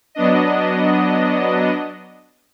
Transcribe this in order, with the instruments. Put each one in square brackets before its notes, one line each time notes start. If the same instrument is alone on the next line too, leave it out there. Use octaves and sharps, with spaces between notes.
[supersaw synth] F#3 B3 D4 D#5